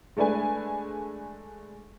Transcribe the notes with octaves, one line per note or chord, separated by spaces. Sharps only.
G#3 A3 D4 B4 G#5